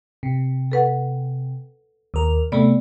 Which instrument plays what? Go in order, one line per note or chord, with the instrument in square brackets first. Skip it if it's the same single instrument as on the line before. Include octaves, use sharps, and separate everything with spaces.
[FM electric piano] C3
[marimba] A4 B4 F#5
[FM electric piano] D#2 A#4
[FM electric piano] C3 A3 [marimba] B3 D5